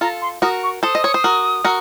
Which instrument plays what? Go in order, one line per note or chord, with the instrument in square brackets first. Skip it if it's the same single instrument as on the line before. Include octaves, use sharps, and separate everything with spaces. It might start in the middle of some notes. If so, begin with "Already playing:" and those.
[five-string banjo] F4 A4 [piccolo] A#5
[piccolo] C6
[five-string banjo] F#4 A#4 [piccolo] D#6
[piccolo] C#6
[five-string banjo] A4 C5 [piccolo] D#6
[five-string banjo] D#5
C#5
C5
F#4 A#4
F#4 A#4